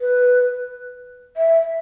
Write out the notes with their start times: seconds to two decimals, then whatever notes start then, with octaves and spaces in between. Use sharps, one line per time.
0.01 B4
1.37 E5